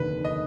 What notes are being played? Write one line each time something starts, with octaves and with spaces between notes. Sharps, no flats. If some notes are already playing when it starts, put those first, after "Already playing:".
Already playing: F1 D#2 D3 B4
D#5